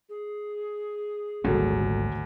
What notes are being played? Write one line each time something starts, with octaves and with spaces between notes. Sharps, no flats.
G#4
G#1 D2 A#2 F#3 G3 A4